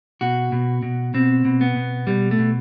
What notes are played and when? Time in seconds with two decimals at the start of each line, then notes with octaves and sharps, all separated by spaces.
0.21 B2 F#4
0.52 B2
0.82 B2
1.14 B2 C4
1.45 B2
1.61 B3
1.76 B2
2.07 B2 G3
2.31 A3
2.39 B2